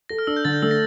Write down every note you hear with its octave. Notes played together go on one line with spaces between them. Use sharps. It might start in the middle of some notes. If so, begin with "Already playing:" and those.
A4 A#6
F6
D4 E6
G6
D3 A6
G6
A3 E6
A#6